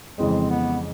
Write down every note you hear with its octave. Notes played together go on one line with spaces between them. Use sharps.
F2 C#3 E3 G#3 C4
B3